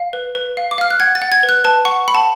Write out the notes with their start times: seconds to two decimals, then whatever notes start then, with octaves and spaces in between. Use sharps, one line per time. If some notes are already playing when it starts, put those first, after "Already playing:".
Already playing: F5
0.13 B4
0.35 B4
0.57 F5
0.71 D6
0.78 F5 F6
0.90 F#6
1.00 F#5 G#6
1.15 A6
1.22 F#5
1.32 G#6
1.43 B4
1.49 F#6
1.64 B4 A5
1.85 F#5 C#6
2.08 F#5 B5
2.15 A5